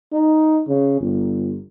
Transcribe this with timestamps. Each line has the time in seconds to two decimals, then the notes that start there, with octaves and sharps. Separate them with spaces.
0.13 D#4
0.68 C#3
1.01 G1